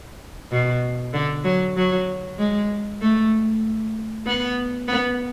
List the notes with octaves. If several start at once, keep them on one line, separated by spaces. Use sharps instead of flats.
B2
D3
F#3
F#3
G#3
A3
B3
B3